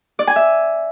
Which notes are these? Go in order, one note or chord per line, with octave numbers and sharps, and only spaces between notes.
D5
G#5
E5